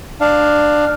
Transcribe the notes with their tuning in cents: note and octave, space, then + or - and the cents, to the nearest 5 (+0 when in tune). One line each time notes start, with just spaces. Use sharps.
D4 +15 F5 +0